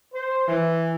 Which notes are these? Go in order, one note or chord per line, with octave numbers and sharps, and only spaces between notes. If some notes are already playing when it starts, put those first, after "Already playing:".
C5
E3